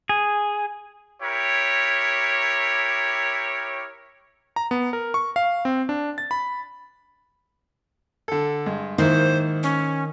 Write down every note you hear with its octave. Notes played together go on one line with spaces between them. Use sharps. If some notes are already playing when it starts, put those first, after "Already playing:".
G#4
E4 G4 A#4 C#5
A#5
B3
A#4
C#6
F5
C4
D4
A6
B5
D3 A4
G2 G#3
G#2 D#3 A#3 E4 C5
C#4